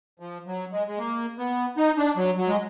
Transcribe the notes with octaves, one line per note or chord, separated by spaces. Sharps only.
F3
F#3
G#3
G#3
A#3
B3
D#4
D4
F#3
F#3
G#3